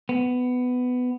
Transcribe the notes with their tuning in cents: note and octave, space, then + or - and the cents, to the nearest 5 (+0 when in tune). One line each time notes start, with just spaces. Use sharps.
B3 +15